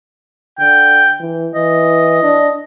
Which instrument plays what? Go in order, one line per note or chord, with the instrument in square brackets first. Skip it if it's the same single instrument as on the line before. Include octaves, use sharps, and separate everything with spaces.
[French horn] D3 [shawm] G5
[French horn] E3
[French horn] E3 [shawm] D#5
[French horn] D4